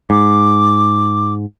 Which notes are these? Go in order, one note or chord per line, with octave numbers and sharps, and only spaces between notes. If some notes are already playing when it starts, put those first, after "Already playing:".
G#2 D6